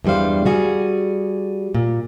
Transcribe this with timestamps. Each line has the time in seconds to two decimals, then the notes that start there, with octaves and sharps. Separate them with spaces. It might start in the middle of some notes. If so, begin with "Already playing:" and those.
0.05 E2 G2 G3 C5 F5
0.45 G3 F#4 G#4
1.75 A#2